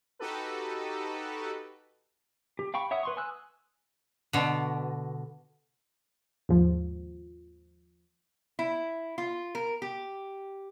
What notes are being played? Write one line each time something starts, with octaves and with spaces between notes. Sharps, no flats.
D#4 F#4 G4 A4 B4
G4
F5 G5 B5 C#6
C#5 E5 F#5 D#6
B4 C6 C#6
G#5 D#6 E6 F#6
B2 D3
D#2 G#2 F3
E4
F4
A#4
G4